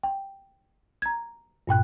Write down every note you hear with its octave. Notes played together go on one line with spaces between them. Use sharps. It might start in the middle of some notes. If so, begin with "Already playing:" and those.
G5
A#5 G#6
G2 A#2 G5 F#6